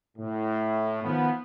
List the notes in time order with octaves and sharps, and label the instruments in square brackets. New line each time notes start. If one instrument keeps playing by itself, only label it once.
[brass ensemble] A2
D#3 F3 B3